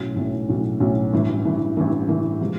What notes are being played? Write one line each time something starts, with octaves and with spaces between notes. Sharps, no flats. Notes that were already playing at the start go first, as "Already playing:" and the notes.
Already playing: B1 A2 F#3 A3 C#4
B1 A2 F#3 A3 C#4
B1 A2 F#3 A3 C#4
B1 A2 F#3 A3 C#4
A1 G2 E3
A1 G2 E3
A1 G2 E3
A1 G2 E3
C3 F3 G#3